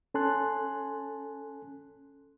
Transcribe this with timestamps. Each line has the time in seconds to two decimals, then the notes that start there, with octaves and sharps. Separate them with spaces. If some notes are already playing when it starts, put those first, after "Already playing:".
0.14 C#4 A4 G#5 A5 C6 F#6